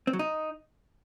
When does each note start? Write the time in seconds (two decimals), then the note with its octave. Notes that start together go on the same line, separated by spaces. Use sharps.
0.07 C4
0.13 F#3
0.19 D#4